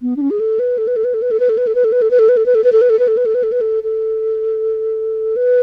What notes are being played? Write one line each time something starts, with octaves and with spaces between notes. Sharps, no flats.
B3
D4
C#4
G#4
A4
B4
A4
B4
A4
B4
A4
B4
A4
B4
A4
B4
A4
B4
A4
B4
A4
B4
A4
B4
A4
B4
A4
B4
A4
B4
A4
B4
A4
B4
A4
B4
A4
B4
A4
A4
B4